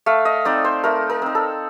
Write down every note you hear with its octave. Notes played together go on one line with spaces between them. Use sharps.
A3 F5
D#5
C4 D#4 D5
C5
A3 A#4
A#4
C4 D#4
A4